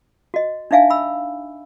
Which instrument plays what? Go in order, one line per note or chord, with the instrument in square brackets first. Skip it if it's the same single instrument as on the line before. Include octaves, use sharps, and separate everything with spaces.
[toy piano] F#4 D#5
D4 D#4 E5 F5 G#5
B5 E6